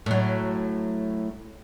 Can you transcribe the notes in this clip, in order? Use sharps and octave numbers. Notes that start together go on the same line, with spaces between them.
A2 F#3